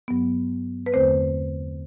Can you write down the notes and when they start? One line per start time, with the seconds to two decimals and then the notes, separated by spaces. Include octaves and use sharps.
0.08 G2 F#3 B3
0.86 B4
0.93 E2 D3 A3 C4 C5